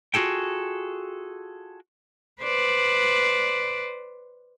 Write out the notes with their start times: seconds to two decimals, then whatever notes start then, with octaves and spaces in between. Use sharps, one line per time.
0.14 F4 F#4 G#4 A4 G5
2.42 B4 C5 D5